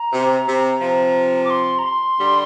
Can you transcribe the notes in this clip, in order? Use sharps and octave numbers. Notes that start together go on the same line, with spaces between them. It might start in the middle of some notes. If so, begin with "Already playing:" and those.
Already playing: A#5
C3
C3
C3 F3
D6
C6
A#5
C6
D3 G3